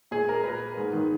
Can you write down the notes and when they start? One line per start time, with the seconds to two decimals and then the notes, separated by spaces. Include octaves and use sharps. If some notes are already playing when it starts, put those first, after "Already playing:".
0.11 A#2 G#4
0.29 A#4
0.44 A#2 B4
0.77 G#2
0.93 D#3